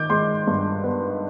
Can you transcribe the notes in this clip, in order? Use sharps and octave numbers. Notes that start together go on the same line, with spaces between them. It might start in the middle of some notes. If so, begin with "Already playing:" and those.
Already playing: D#3 D6 G6
G#3 C6
G2
B3